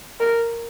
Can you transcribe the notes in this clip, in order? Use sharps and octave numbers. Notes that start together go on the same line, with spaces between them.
A#4